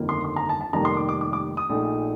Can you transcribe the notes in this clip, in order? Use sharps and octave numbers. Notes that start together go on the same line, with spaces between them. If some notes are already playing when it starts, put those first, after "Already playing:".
Already playing: G1 F2 D#3 A#3
C6
C6
A#5
A5
A5
F1 F2 D#3 G3 A#3 A#5
C6
D6
D6
D6
D6
D#6
A#1 A#2 A3 D#4